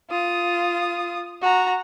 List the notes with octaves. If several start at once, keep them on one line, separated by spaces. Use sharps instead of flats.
F4 D#6
F#4 A#5